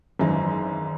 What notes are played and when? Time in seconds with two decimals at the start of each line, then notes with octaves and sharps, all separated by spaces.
0.19 G#1 F#2 E3 G#3 D#4